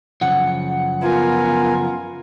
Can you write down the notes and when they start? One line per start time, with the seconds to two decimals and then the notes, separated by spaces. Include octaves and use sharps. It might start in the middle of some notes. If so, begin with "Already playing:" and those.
0.21 F#2 C#3 F3 F#5 C#7
1.02 B3 F4 A#4 G#5